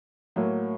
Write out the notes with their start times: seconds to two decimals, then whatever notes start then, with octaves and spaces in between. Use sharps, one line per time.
0.36 A2 F#3 A#3